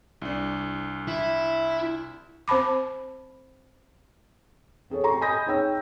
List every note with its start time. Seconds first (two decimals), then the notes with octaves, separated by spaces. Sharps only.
0.22 C2 D4
1.08 E4
2.48 C4 C5 A5 B5 D6
4.90 C4 G#4 A4 C#5
5.04 G4 A#5 C6 C#6
5.21 D#5 G#5 B5 D#6 G6 A#6
5.46 D#4 G#4 C#5 G5 E6